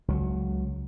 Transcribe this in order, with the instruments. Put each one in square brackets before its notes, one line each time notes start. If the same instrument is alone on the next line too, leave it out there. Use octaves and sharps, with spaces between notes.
[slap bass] C#2 F#3